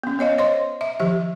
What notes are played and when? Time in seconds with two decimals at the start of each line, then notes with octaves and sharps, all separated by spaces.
0.03 B3 C#4
0.19 B3 C#5 D#5 F5
0.38 C5 C#5 D#5 C6
0.81 E5
1.00 D#3 F3 G4 E5